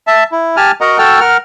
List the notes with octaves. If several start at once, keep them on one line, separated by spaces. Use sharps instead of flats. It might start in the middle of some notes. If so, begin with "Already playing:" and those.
E5 A5
E4
G4 G#5 A5 F6
F#4 A#4 D#5 F#5 A#5
F#4 A4 G5 A5 E6 F6
A#4 F#5 F6